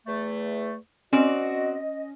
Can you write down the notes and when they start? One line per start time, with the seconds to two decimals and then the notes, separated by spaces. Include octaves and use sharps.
0.06 E2 A3
1.13 C4 C#4 F#4 D5 D#5